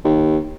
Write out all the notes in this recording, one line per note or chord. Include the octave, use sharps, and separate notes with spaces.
D#2